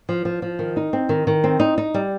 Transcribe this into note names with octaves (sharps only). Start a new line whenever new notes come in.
F3
F3
F3
D#3
D#4
C4
D#3
D#3
C4
D#4
D#4
G3